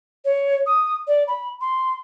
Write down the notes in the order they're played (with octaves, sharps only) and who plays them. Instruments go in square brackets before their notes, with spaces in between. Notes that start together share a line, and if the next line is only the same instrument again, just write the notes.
[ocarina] C#5
D#6
D5
B5
C6